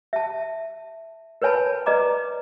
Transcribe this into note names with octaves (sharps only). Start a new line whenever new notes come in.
E5 A5
A#4 B4 C#5 G#5 A5 B5
B4 D5 D#5 A#5 D6